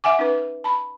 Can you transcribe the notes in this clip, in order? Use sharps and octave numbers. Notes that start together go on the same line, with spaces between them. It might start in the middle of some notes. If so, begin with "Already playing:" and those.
E5 F#5 G#5 D6
C#4 D#4 B4
A5 B5